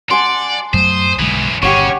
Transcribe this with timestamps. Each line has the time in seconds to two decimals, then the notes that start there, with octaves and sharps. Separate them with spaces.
0.11 D5 F#5 G#5 A5 C6
0.73 F#2 F#3 A3 C5 D#6
1.19 B1 F#2 D3 E3 G#3
1.62 G1 A#2 C#3 C#4 G4 C#5 F#5 C#6